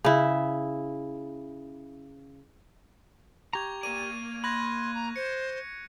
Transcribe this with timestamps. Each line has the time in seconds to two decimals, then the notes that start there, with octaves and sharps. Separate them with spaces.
0.04 C#3 E4
3.53 G4 A#5 C#6 G#6 F7
3.83 A#3 A#4 D5 D#7
4.44 B5 C6 F#6 G#6 A#6
4.94 A#5
5.16 C5 C#7